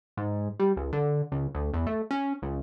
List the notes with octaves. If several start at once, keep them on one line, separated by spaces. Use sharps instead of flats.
G#2
G3
C#2
D3
C#2
D2
E2
A3
C#4
C#2